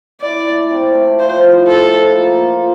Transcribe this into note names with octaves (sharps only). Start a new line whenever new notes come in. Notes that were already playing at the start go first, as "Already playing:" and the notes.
E4 D5
A3
C3
A3
F3 C5
E4
A3 A4
F3
A#3
F4